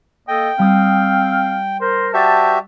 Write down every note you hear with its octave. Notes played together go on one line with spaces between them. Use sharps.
A#3 A4 D#5 G5
G3 C4 F5 D#6
A#4 C5
F#4 G4 C5 D5 E5 A5